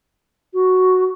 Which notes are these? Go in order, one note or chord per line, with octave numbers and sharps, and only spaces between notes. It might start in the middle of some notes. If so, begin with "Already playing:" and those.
F#4